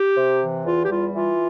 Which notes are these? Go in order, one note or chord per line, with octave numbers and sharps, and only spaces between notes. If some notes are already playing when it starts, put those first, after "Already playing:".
Already playing: G4
C3
E3
E2 F4
G4
G3 F4
E3 F4